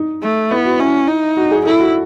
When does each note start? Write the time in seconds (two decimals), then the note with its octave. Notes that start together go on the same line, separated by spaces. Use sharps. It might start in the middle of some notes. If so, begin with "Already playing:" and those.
Already playing: D#4
0.23 A3
0.51 B3 E4
0.65 F#4
0.79 C#4 E4
1.08 D#4
1.37 F#4
1.51 G#4
1.65 E4 A4
1.80 F#4